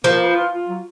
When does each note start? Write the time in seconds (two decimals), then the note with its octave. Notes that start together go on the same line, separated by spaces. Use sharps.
0.04 F3 A#3
0.21 B4
0.36 F4
0.52 F4
0.68 F#3